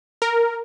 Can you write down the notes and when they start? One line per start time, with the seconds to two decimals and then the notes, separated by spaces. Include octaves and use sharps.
0.22 A#4